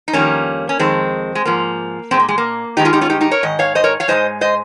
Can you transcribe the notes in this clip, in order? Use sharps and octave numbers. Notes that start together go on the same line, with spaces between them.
D#4
F2 D#3 G3 A#3 C#4
C#4
F2 D#3 G#3 C4
G#3
G#2 F3 A#3
A#2 G#3 C4
A#3
G#3
A#3
G2 D#3 G#3 D#4 G4
F4 G#4
D#4 G4
C#4 F4
D#4 G4
D#4 G4
A#4 C#5
G#2 D#3 D#5
C#5 F5
C5 D#5
A#4 C#5
C#5 F5
G#2 D#3 G#3 C5 D#5
C5 D#5